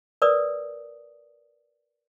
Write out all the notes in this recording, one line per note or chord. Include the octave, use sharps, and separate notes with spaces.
A#4 B4 D5 D#6